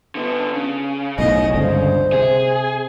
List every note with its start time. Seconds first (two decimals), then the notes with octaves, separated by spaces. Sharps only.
0.15 D3 B3
0.54 C#3
1.19 B1 A2 D#5
1.54 G1 C#2 D3 C5
2.12 C3 G#4